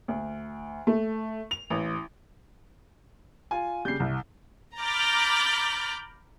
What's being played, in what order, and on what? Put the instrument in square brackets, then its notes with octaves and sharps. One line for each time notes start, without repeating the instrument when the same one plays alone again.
[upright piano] D2
A3
F7
A1
[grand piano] F4 G#5
[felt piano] C#3 G3 [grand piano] G6 C7
[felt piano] C2
[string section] A#5 B5 D6 F6 G6 A6